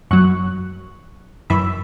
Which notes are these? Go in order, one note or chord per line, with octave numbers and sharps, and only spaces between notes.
F#2 F#3 C#6 F#6
F#2 E3 B5 E6